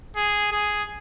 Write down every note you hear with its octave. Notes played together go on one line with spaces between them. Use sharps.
G#4
G#4